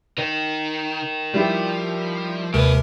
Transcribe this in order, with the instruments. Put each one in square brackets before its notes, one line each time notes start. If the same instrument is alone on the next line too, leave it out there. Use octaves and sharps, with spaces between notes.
[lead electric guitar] D#3 [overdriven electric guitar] A#4 D#5
[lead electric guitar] F3 [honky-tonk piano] G3 E4 G4
[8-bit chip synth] D#2 C3 A#4 [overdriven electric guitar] G#2 B4